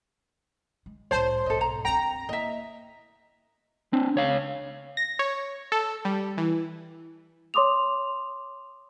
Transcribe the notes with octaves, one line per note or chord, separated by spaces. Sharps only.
G#3
C2 A2 C5 C#5 A5
B1 G#2 A4 D#5
A#5
G2 C4 G5 A#5
A#3 E4 D#5 E5
C4 D4
C#2 C#5 F5
A#6
C#5
A4
G3
E3
C#5 C6 D6 D#6 F7